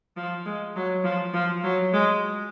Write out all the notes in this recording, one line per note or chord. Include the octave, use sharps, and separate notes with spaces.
F3
G#3
F#3
F3
F3
F#3
G#3